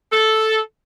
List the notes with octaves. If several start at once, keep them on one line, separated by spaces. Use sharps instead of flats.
A4